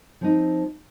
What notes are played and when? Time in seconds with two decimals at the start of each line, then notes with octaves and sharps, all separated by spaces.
0.21 F3 C4 D#4